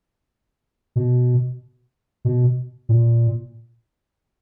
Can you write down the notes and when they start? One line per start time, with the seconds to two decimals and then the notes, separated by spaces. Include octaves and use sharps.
0.96 B2
2.25 B2
2.89 A#2